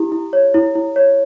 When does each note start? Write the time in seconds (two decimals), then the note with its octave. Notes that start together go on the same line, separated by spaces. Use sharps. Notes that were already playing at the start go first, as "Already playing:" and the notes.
Already playing: E4 G4
0.12 E4
0.33 C#5
0.54 E4
0.75 E4
0.96 C#5